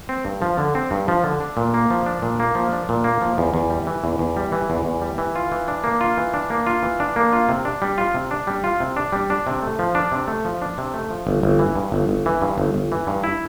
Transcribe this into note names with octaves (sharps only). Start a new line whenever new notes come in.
C4
G2
F3
D3
C4
G2
F3
D3
D4
A#2
A#3
F3
D4
A#2
A#3
F3
D4
A#2
A#3
F3
E2
E2
G3
E3
E2
E2
G3
E3
E2
E2
G3
E3
F4
E3
D4
A#3
F4
E3
D4
A#3
F4
E3
D4
A#3
F4
C3
D4
G3
F4
C3
D4
G3
F4
C3
D4
G3
D4
C3
A3
F3
D4
C3
A3
F3
D4
C3
A3
F3
G1
G1
E3
G2
G1
G1
E3
G2
G1
G1
E3
G2
E4